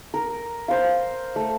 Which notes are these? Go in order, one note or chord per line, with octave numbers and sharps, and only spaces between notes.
A#4
C5 F5
A3